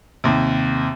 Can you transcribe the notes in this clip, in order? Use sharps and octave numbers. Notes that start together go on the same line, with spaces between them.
D#2 C3